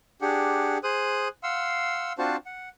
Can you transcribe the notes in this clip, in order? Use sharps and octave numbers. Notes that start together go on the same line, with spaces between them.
D4 G4 G#4 F#5
G#4 C5 D#6 F#6
F5 F#5 C6 E6
C4 D4 F4 F#4 C5 A5
F#5